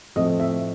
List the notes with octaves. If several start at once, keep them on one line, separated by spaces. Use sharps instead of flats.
A2 F3 A3 C4 D#5
E5